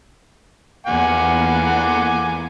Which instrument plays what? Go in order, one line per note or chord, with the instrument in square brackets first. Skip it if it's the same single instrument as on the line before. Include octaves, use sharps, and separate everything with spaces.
[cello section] E2 A#3 [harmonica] F#5 G#5 D6